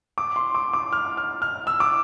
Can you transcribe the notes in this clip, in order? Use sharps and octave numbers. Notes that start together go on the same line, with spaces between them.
D6
C6
D6
D6
F6
F6
F6
E6
D6